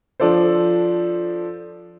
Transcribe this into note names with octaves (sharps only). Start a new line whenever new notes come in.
F3 D4 A4 C5